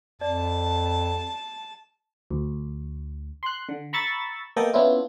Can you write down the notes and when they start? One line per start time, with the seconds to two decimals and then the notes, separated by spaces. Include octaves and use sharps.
0.21 F2 D5 A5
2.31 D2
3.43 C6 F#6
3.69 D3
3.93 A#5 B5 C#6 E6 A6
4.56 A#3 B3 A4 D#5 G5
4.73 B3 C#4 D4 E4 F4